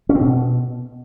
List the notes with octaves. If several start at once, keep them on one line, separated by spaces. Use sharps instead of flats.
C#4
C4
B2